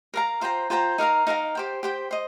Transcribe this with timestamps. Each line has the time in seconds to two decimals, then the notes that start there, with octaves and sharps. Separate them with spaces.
0.14 A#4 F5 A#5
0.41 F4 C5 G5 A#5
0.70 F4 C5 G5 A#5
0.98 D#4 A#4 F5 A#5
1.27 D#4 A#4 F5 A#5
1.55 G4 C5 G5
1.83 G4 C5 G5
2.11 C5 D#5